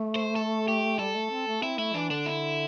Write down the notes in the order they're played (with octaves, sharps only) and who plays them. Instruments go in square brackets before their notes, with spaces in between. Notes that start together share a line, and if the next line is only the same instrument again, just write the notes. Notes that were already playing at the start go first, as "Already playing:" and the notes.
Already playing: [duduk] A3
[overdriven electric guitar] C5
A4
G4
[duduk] G3 [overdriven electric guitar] A4
[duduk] A3
C4
A3
[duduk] C4 [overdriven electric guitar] E4
[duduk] A3 [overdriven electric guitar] E4
[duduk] E3 [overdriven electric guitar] D4
[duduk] D3 [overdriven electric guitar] D4
[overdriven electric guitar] E4